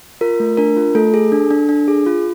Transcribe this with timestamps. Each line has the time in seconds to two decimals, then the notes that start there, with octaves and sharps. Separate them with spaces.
0.21 F4 A#4
0.40 A3
0.57 D4 A#4
0.77 F4
0.95 A3 A4
1.14 G#4
1.32 D4
1.51 D4
1.69 D4
1.88 G#4
2.06 F4